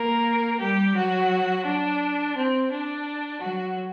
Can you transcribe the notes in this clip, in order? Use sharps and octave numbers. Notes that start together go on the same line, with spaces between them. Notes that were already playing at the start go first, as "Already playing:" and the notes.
Already playing: A#3 A#4
G3 G4
F#3 F#4
D4
C4
D4
F#3 F#4